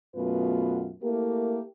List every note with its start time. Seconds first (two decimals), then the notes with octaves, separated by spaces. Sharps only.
0.16 F#2 B2 A3 B3 F4 B4
1.02 A3 A#3 E4 G4 A#4